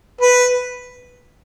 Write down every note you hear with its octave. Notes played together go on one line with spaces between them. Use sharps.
B4